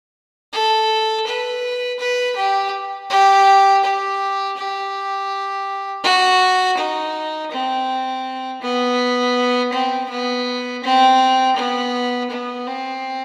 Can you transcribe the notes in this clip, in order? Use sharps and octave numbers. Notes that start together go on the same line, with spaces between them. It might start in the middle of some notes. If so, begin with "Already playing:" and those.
A4
B4
B4
G4
G4
G4
G4
F#4
D#4
C4
B3
C4
B3
C4
B3
B3
C4